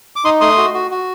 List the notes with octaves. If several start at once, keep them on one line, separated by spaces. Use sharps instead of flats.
D6
D#4 C6 D#6
A3 C6 D#6
F#4
F#4
F#4